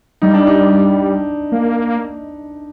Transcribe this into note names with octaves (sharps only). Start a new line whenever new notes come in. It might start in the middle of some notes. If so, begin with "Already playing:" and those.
G3 D#4
D4
D#4
A#3